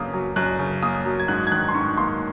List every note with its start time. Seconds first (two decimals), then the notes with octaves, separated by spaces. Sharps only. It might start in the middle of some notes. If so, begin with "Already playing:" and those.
Already playing: F#2 C#3 A#3 D#6
0.13 F#3
0.36 F#2 F#6
0.59 C#3
0.83 A#3 D#6
1.05 F#3
1.19 G#6
1.28 G#2 F#6
1.47 G#6
1.52 D#3 F#6
1.69 C6
1.74 G#2 C#6
1.97 A#3 C6